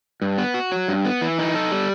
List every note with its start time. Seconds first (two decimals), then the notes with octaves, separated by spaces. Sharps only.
0.22 G2
0.38 B3
0.54 F#4
0.72 F#3
0.88 G2
1.05 B3
1.22 E3
1.39 D#4
1.55 A4
1.71 G3